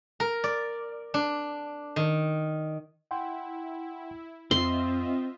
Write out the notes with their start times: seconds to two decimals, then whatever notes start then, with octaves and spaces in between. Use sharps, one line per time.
0.20 A#4
0.44 D5
1.14 D4
1.96 D#3
3.11 E4 F#5 G5 C6
4.51 F2 C4 F4 D#5 E5 C6